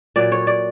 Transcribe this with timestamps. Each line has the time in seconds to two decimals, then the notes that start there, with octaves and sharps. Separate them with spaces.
0.16 A#2 F#3 D5
0.32 C#5
0.47 D5